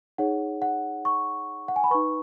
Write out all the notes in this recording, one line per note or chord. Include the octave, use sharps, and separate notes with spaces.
D#4 G#4 C#5 F#5
F#5
C#6
F#5
G#5
B5
D#4 B4 C#6